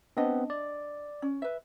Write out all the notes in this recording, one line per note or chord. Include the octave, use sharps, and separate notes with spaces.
B3 C4 D4 D#5
D5
C#4
B4 E5